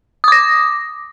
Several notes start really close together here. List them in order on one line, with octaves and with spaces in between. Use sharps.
D#6 D6 A#6